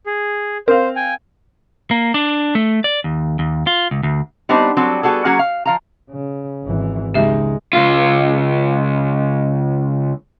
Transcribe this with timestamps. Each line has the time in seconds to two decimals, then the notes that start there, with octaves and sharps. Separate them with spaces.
0.06 G#4
0.68 C4 A#4 C5 F5
0.96 G5 G#5
1.91 A#3
2.14 D4
2.55 A3
2.84 D5
3.04 D#2
3.39 D#2
3.67 F4
3.91 C#2
4.03 D2
4.49 G3 B3 C4 D4 D#4 C5
4.77 F#3 G3 C4 F#4 A4
5.03 G3 B3 F#4 G#4 A4
5.25 F#3 A#3 C#4 F#4 G#4 F#5
5.39 F5
5.66 F3 F5 A#5
6.10 C#3
6.64 G#1 E3
7.14 C#2 G#3 D#4 G4 E5
7.73 C#2 F4